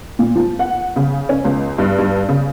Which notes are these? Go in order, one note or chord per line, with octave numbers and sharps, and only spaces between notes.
A#2
F3
F#5
C#3
C#4
C#2
G2
G2
C#3